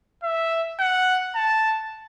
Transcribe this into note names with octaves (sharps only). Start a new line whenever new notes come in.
E5
F#5
A5